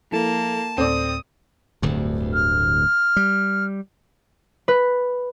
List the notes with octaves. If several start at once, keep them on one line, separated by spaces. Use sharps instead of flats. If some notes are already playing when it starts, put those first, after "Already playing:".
F3 A#3 E4 A4 A5
D2 A2 C4 A4 D5 D#6
D1 D2 G2
F6
G3
B4